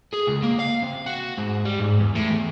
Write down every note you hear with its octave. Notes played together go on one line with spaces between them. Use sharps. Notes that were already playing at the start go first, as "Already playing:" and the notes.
G#4
C#2
A#3
F5
C3
F#4
G#2
G3
G#2
E2
A2
E2